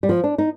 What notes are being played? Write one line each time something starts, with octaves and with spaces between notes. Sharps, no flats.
G3
F3
D4
D#4